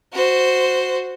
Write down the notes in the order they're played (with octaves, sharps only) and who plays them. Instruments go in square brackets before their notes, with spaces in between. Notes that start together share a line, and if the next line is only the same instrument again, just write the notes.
[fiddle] F#4 C5